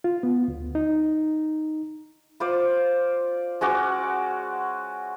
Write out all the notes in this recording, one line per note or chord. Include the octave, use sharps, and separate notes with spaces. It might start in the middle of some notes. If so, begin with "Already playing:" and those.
F4
B3
D2
D#4
F4 C5 D5
G#3 C#4 F#4 D5